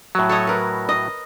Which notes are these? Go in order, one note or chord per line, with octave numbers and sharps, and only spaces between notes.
A2 F#3
A4 C#5 D#5
A#4 B4
D#5